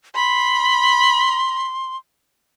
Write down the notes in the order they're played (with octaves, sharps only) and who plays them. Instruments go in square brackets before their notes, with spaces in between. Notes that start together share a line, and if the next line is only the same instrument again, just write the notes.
[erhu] B5 [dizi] C6